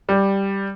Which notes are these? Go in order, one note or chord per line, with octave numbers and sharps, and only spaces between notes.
G3